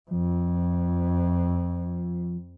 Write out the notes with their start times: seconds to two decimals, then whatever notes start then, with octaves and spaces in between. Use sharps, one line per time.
0.11 F2 F3